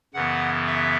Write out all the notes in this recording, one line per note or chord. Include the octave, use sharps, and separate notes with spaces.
F#2 C#3 E3 B3 F#5
E5